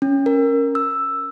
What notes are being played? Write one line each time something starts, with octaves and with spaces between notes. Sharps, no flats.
C#4
A#4
E6